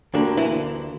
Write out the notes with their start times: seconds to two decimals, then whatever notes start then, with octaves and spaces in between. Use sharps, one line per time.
0.14 D2 D3 G3 A#3 D4
0.37 E3 E4